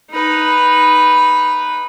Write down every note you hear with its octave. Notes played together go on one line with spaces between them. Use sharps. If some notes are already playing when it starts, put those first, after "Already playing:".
D#4 B4